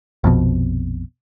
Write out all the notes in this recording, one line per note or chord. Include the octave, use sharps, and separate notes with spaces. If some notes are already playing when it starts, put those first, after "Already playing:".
A#1 F2 B2